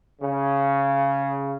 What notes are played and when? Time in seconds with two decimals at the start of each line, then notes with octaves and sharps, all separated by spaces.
0.22 C#3